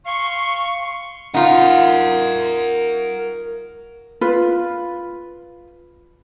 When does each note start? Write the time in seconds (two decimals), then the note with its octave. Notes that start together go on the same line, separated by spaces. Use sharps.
0.06 F5 C6 C#6
1.34 D#4 F4 A#4 F#5
4.21 F4 B4